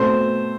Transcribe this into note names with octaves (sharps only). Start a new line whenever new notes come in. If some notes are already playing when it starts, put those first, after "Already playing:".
Already playing: B2 A3 C4 C5